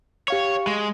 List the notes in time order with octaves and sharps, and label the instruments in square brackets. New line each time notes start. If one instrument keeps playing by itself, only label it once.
[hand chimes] G4 F5 C#6 [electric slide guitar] C#5
[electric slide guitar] G#3